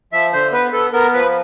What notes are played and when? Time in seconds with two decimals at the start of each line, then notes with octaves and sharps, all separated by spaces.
0.13 F3 E5
0.33 D3 C5
0.52 B3 B4
0.72 B3 A4
0.93 B3 A#4
1.13 F3 B4